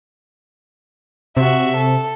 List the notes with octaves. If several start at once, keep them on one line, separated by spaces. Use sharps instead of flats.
C3 F#4 E5
A4